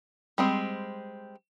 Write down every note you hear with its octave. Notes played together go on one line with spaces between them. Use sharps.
G3 G#3 C4